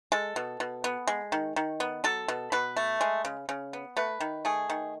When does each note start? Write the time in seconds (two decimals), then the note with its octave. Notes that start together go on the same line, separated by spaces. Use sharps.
0.12 G#3 A4
0.36 B2
0.60 B2
0.84 B3
1.08 G#3
1.32 D#3
1.56 D#3
1.80 B3
2.04 F#3 A4
2.28 B2
2.52 B2 B4
2.77 A3
3.01 G#3
3.25 C#3
3.49 C#3
3.73 B3
3.97 A3 B4
4.20 D#3
4.45 A3 G#4
4.70 D#3